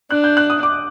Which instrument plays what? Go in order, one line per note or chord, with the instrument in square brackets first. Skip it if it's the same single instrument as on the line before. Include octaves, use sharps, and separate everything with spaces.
[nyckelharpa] D4 [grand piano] F#6
[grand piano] G6
F#6
D#6
D6